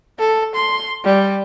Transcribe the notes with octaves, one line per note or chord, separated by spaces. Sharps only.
A4
C6
G3